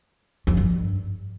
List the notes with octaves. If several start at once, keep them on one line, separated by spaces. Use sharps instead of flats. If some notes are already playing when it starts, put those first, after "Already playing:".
F2
G2